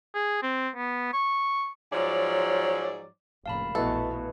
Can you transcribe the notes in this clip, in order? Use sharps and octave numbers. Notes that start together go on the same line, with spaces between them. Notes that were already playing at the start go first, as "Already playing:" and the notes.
G#4
C4
B3
C#6
G#2 F3 F#3 C#5 D5
F1 C#2 A#2 F5 A5 B5
A#1 B2 E3 A3 B3 A4